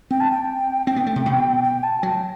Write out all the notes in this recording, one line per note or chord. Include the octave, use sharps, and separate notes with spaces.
C4 G5
A5
G5
C4 G5
B3
A3
C3
B2
G5
A5
F#3 G5